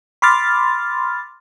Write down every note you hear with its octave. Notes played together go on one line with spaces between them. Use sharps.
B5 C6 D6 F6 A6